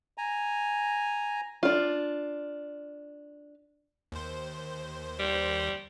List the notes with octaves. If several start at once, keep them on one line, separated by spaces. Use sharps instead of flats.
G#5 A#5
D4 F4
D#2 C5
G3